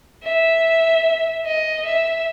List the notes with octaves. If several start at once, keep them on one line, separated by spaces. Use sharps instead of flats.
E5
D#5
E5